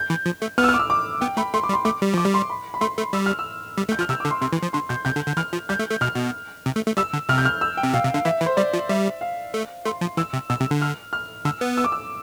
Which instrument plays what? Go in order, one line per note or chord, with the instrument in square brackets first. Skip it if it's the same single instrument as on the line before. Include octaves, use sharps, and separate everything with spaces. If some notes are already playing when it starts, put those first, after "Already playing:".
Already playing: [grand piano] G6
[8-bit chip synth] E3
F3
A3
[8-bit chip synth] B3 [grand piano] F6
[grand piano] E6
F6
D6
E6
D6
[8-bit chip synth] B3 [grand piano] G5
[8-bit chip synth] A3 [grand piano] B5
[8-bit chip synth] A3 [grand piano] C6
[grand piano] D6
[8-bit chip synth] G3
[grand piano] C6
[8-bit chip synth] A3 [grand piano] D6
[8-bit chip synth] G3
[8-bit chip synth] F3 [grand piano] D6
[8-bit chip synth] G3
[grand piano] C6
B5
B5
[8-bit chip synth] A3 [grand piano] C6
[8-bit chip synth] A3
[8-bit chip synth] G3 [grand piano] E6
[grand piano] F6
E6
[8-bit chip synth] G3
A3
[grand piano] G6
[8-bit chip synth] F3 [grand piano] F6
[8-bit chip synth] C3 [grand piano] E6
[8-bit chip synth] D3 [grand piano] D6
[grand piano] C6
[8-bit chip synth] C3 [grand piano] C6
[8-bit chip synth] E3
F3
[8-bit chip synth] D3 [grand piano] C6
[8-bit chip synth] B2 [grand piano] G6
[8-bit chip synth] C3 [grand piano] G6
[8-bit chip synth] D3
D3
[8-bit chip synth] E3 [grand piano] F6
[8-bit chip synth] F3
[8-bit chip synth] G3 [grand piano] G6
[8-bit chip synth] A3
A3
[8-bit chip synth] B2 [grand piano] F6
[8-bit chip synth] B2
C3
A3
A3
[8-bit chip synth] G3 [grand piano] E6
[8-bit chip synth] D3
[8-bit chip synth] C3 [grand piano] F6
[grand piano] G6
F6
E6
G5
[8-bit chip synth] C3
[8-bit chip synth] B2 [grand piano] F5
[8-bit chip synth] C3
[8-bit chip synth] D3 [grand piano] F5
[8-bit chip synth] E3 [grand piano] E5
[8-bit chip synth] E3
[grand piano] C5
[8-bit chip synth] G3 [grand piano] D5
[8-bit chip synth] F3
[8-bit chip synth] G3 [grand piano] E5
[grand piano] F5
[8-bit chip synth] A3
[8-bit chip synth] A3 [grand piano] C6
[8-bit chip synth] F3
[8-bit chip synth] E3 [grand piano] E6
[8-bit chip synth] C3
[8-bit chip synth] B2 [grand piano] E6
[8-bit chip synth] C3
D3
[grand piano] F6
F6
[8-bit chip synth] D3 [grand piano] E6
[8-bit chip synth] B3
[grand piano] E6
D6
E6